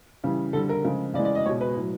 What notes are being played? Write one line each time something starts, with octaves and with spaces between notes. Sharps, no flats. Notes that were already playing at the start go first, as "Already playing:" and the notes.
C#3 E3 G3
D3 G3 A4
A#4
C#3 F3 G#3
C#3 E3 G#3 D5
D5
D#5
B2 G#3 C#5
B4
A2 F#3